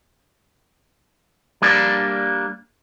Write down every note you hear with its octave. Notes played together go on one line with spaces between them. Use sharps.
G3 A#3 D4